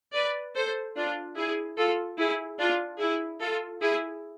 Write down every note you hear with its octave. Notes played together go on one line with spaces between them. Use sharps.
B4 D5
A4 C5
D4 F4
E4 G#4
F4 A4
E4 G#4
D4 F4
E4 G#4
F4 A4
E4 G#4